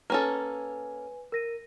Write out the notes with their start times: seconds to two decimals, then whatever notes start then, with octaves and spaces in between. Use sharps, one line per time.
0.10 A#3 C#4 A4 B4 G#5
1.32 A#4 A#6 D#7